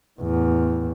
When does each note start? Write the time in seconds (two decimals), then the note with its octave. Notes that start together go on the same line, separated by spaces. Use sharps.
0.20 E2 A2